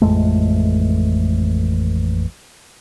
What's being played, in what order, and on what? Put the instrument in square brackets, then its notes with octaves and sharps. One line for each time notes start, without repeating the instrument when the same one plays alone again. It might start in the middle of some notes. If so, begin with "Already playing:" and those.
[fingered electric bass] A1 F2 G#3 A3